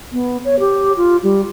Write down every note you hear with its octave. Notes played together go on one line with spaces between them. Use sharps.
B3
C#5
G4
F4
G3